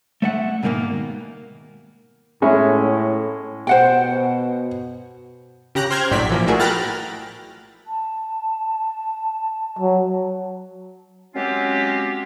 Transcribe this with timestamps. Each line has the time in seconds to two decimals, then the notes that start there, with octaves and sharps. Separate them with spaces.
0.22 A3 E5 F#5
0.63 G#2 B2 D#3 G#3 A#3
2.42 A2 G#3 C#4 E4
3.67 B2 C5 F#5 G5
5.75 C#3 G4 A#5 F#6
5.90 C5 G5 F6 G6 G#6
6.11 A#1 A2 F#3 D5 B6
6.30 E3 F3 A#3
6.47 A3 E4 F#4 G#4 A#4
6.59 G5 A#5 B5 F6 F#6 A6
7.87 A5
9.79 F#3
11.35 F#3 G#3 C4 C#4 F4 G4